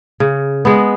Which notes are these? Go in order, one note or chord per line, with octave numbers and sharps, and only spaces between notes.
C#3
G#3 B3